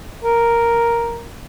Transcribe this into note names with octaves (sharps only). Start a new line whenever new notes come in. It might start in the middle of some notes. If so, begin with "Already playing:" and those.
A#4